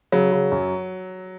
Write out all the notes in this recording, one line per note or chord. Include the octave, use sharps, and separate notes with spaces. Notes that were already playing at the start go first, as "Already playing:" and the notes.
C#3 F#3
C#3
F#2